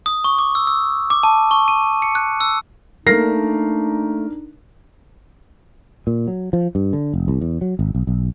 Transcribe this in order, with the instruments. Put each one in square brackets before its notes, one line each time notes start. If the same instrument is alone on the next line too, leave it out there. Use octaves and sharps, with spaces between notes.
[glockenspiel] D#6
C#6
D6
E6
E6
D6
A5
C#6
D#7
C#7
F#6
E6
[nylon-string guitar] A3 A#3 [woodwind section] D4 D#4 [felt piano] A#4 A#6 C7
[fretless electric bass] A#2
F#3
F3
G2
D3
F1
C2
E2
F#3
G#1
B1
B1